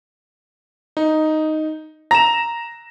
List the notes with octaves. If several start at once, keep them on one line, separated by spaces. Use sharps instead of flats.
D#4
A#5 A#6 E7